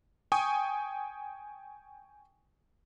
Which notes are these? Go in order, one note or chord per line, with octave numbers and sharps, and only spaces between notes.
G5 G#5 C#6 D#6